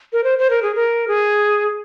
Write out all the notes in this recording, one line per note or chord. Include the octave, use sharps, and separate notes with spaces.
A#4
C5
C5
A#4
G#4
A#4
G#4